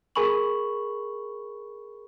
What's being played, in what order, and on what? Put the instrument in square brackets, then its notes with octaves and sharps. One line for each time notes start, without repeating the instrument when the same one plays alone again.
[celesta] G#4 A#4 G#5 B5 C#6 F#7